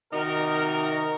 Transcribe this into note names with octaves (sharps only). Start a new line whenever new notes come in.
C3 D#3 D#4 F#4 A#4